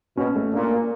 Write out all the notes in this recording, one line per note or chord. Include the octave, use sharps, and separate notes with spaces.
B2 C#4
A3
A#2 D4
A#3